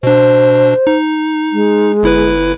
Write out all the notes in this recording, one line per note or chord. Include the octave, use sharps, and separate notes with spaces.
B2 D4 C5
D#4
G#3
G1 E4 B4